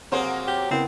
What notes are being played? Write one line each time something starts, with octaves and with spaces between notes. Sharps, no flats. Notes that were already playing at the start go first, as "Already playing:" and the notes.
C3 F#3 A#3 G#4 C5
G4
C#3 B3 C4 E4 A#4